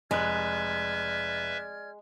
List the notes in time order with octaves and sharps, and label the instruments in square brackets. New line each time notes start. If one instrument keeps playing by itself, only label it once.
[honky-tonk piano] F1 F#6 [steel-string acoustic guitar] G#3 [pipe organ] B4 E5 [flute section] D5 F6 G#6